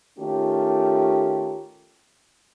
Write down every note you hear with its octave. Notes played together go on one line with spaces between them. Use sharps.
D#3 A3 C#4 F4 G4